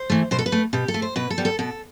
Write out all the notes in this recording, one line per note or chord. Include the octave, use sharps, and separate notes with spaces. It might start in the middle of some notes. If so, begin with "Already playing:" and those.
Already playing: C5
E3 A3
B2 C5
A4
B4
A3
B2 G4
A4
A3
C5
B2 B4
A4
G3 B3
A4
B2 A4